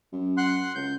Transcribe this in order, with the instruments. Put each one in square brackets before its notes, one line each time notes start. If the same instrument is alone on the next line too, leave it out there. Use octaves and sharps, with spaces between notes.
[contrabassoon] F#2
[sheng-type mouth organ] F#5 C6 F#6
[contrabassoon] C#2 [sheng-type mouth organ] G6